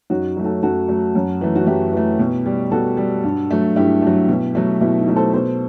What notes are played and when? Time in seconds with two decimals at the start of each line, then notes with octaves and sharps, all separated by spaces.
0.10 F#2 D#4 F#4
0.37 F#3 A3
0.44 F#4 A4
0.63 F#2 F#4 A4
0.88 F#3 A3
1.15 F#2
1.41 E3 A3
1.56 F#4
1.66 F#2 E4 G4
1.93 E3 A3
2.19 B2
2.46 G3
2.71 B2 F#4 A4
2.97 G3
3.24 G2
3.51 F#3 A3
3.76 G2 E4 G4
4.02 F#3 A3
4.29 B2
4.55 F#3 A3
4.81 B2 E4
4.99 D#4
5.08 F#3 A3
5.16 A4 C5
5.34 B2 A4 C5